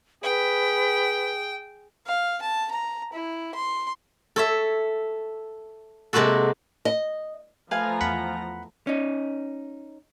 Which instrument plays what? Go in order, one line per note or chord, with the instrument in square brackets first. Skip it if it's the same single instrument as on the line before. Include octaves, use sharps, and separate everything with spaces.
[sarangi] G#4 [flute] B4 [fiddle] G5
[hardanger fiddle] F5
A5
A#5
E4
C6
[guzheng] A4 C#5 E5
C3 G#3 A#3 F#4 A4
[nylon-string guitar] D#5
[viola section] F3 A3 A#5 [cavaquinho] B4 F5 G#5
[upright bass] E2 [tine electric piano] F#5 B5
[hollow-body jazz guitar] C#4 D#4